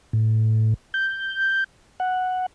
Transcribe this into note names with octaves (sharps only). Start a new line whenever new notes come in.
A2
G6
F#5